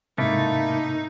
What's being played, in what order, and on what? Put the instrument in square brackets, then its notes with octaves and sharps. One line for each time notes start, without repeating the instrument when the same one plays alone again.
[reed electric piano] G#2 C3 [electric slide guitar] A3 A#3 E4 [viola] D#4